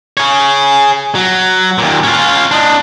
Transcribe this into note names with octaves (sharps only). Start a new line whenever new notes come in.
G#4 C#5
F#3
D#2 A#2
C#4 F4
D4 D#5